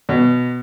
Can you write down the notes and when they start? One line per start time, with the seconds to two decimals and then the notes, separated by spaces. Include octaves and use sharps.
0.09 B2